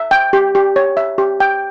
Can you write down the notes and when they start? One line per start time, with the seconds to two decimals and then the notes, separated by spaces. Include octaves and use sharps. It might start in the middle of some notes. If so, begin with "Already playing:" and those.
Already playing: E5
0.11 G5
0.33 G4
0.55 G4
0.76 C#5
0.97 E5
1.18 G4
1.40 G5